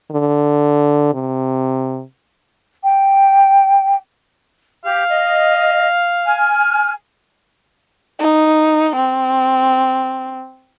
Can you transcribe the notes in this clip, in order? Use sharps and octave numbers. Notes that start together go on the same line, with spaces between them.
D3
C3
G5
G4 F5
D#5
G#5 F6
D#4
C4